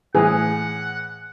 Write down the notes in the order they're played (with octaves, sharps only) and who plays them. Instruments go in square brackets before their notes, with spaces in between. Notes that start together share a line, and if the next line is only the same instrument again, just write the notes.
[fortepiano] A2 E3 [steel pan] G#4 [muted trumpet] F#5